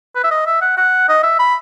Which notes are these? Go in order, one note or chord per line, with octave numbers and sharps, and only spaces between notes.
B4
E5
D#5
E5
F#5
F#5
D#5
E5
B5